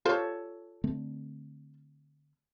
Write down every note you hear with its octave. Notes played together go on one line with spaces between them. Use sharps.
F4 G4 A4 C5 C#5
D3 A3 C4